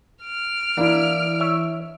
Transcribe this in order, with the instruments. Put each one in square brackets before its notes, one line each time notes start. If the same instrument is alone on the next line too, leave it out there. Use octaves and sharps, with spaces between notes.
[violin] F6 D7
[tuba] E3 [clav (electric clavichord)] A#3 [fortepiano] D4 E4
[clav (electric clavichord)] C#5 E5